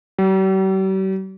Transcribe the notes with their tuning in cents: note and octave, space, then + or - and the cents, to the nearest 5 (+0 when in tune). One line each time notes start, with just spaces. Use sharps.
G3 -45